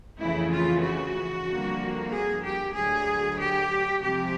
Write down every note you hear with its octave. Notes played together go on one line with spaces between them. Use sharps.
F2 C#3 E3 A3 E4
F4
F#4
F2 D3 G3 A#3
G#4
G4
D2 D3 F#3 G#4
G4
C3 F3 G#3 C4 G4